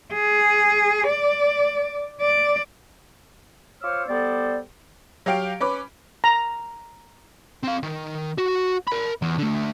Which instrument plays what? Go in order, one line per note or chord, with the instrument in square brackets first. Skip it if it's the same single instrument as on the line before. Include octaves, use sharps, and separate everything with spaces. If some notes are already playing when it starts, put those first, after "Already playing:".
[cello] G#4
D5
D5
[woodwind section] F4 C5 C#5 D6 E6 F6
G3 B3 A4 C5 D5
[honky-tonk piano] F#3 G4 F5 G5 D7
C#4 B4 D6
[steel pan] A#5
[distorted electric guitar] C4 F5
D#3
F#4
A#4 B5
E2
D3 A3